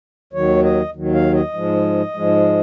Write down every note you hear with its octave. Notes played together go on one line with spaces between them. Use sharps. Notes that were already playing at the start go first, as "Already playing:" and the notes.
D#2 D#3 F#3 C#5
D#5
D#2 D#3 F#3
F5
D#5
G#2 F3 G#3
G#2 F3 G#3